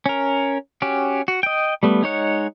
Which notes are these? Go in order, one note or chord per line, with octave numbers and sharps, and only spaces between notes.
C#4 A#4
C#4 F#4 G4
F#4
D#5 G5
G3 A3 B3
G#3 D#4 C#5 F#5